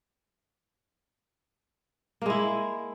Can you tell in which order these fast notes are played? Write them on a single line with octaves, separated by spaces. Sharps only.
A#3 G#3 E4